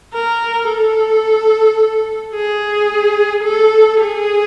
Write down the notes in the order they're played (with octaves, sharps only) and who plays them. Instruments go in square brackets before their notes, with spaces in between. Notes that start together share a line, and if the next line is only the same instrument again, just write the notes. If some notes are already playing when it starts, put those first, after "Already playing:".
[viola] A#4
A4
G#4
A4
G#4